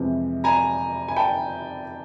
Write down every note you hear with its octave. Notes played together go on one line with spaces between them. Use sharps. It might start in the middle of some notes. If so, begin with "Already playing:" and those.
Already playing: F2 C3 E3 G#3
G#5 A#5
G#5
G5 A5